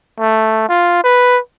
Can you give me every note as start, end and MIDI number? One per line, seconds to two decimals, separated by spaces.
0.20 0.65 57
0.69 1.00 65
1.04 1.39 71